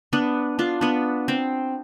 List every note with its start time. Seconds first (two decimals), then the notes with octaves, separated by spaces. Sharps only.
0.13 B3 D4
0.59 D4 F4
0.81 B3 D4
1.28 C4